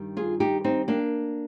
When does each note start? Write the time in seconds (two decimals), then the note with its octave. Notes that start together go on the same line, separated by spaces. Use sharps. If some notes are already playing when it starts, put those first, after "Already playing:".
Already playing: G2 D#3 G3
0.17 F4 G#4
0.40 D#4 G4
0.64 C4 D#4
0.88 A#3 D4